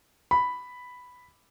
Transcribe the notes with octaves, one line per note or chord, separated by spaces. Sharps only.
B5